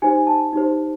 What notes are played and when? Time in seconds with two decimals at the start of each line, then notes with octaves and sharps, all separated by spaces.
0.02 D#4 G4 C5 G#5
0.27 A5
0.53 D#4 G4 C5